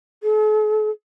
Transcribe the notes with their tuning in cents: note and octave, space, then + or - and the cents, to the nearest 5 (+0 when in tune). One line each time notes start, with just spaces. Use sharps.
A4 -45